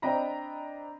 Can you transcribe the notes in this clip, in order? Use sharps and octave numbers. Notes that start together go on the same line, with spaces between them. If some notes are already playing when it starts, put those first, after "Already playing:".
C4 D4 D#5 G5 A#5 B5